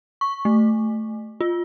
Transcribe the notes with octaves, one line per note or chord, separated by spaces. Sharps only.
C#6
A3
F4